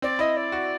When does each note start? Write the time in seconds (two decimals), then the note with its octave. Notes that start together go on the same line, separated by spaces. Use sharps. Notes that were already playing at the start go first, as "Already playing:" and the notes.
0.02 C4 D5
0.19 E4 D#5
0.36 D5
0.52 F#4